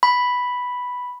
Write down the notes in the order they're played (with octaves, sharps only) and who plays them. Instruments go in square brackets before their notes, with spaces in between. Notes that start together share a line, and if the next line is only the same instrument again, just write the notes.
[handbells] B5